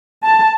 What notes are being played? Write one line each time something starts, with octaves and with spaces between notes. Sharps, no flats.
A5